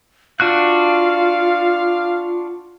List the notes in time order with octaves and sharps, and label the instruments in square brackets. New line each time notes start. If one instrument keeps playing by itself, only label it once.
[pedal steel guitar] D4 F#4 F#6 [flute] F4 [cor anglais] F5